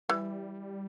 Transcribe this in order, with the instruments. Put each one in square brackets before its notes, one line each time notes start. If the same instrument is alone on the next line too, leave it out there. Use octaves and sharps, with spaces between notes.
[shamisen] E3 [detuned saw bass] G3